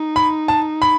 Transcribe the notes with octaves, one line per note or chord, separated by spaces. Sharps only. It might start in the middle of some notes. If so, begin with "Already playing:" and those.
Already playing: D#4
B5
A5
B5